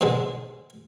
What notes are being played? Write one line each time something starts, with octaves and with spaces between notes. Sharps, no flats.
G#2 B2 D3 G#3